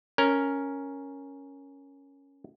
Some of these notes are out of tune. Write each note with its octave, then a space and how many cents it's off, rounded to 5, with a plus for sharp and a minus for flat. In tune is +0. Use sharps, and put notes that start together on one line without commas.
C#4 +0 A#4 +0